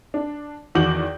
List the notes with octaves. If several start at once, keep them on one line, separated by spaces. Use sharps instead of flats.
D4
E2 D#3 F#4 D6 G6 F#7